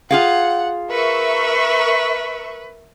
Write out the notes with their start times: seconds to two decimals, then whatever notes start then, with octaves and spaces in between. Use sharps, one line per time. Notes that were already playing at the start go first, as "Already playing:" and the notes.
0.11 F4 G#4 F5 F#5
0.91 A#4 B4 E5 C#6